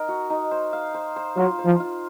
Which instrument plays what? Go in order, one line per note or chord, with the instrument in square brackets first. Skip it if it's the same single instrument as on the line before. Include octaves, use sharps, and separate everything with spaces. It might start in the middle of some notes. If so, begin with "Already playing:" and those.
Already playing: [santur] D#4 A#4
F#4
D#4
C5
F5
C5
C5
[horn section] F#3 [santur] F4
[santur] C5
[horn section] F3
[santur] F4